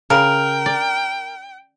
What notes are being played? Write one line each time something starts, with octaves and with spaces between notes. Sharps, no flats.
C#3 A#4 G5
D5